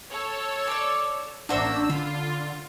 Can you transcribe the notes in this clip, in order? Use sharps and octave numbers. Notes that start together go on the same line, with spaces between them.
A4 C#5 E6
D5 D6
A1 A#3 D4 F#4 C5 E5 E6
D3 F4 B5